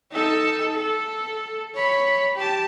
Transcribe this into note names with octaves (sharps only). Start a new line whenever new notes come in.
D#4 A4
A4
C#5 B5
G4 A5